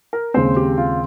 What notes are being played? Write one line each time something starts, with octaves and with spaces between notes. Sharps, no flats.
A#4
D#2 C#3 G#3 C4 C5
G4
F4